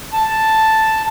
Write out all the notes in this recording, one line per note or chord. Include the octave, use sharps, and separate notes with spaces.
A5